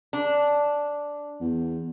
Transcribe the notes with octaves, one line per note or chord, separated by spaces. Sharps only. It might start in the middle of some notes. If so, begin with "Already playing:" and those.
D4
E2